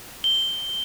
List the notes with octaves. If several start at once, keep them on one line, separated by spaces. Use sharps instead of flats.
G7